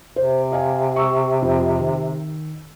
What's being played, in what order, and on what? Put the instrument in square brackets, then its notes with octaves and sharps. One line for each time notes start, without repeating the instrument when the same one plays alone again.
[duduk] C3 [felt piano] C5
[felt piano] D#5 F5 G#5
C#6 E6
F2
D#3